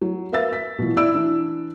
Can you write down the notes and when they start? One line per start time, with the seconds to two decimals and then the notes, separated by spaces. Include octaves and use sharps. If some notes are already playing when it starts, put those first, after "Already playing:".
0.01 F#3
0.32 A#4 B4 E5 F5 E6 A6
0.53 B6
0.78 B2 E3 F3
0.96 E4 D5 E6 D7
1.14 E3 D4